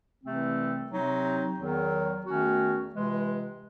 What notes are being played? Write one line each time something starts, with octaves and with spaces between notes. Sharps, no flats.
C2 C3 E3 A3 C4
C3 F#3 C4 D#4
E2 D#3 F#3
E2 D#3 A3 C#4 F#4
C#2 C3 E3 G#3